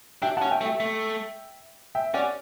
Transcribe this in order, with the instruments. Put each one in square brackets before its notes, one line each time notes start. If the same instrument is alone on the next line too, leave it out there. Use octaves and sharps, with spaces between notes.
[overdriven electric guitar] D4 [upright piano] E5 G5
[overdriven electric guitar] C#4 [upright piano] F#5 A5
[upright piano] E5 G5
[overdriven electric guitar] A3
[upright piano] E5 G5
[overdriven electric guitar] A3
[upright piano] E5 G5
[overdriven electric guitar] C#4 [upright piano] D5 F#5